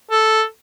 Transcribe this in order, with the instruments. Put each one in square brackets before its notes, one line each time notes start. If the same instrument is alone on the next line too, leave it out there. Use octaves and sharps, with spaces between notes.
[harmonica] A4